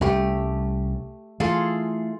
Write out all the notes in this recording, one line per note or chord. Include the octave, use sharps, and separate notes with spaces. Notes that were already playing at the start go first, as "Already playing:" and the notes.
C2 G3 A3 C#4 G4
E3 A3 F4 G#4 A4